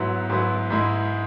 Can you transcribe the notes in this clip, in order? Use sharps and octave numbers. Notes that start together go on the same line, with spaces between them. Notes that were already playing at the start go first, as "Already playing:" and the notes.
Already playing: G#2 F#3 B3 E4
G#2 F#3 B3 E4
G#2 G#3 E4